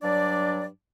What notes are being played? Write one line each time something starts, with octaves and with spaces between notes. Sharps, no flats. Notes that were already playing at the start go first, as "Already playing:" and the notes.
G2 F#3 D4 D5